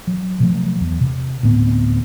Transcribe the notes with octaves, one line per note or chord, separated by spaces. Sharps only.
F#3
C3 F3 F#3 A3
E2
C3
D2 A2 B3 C4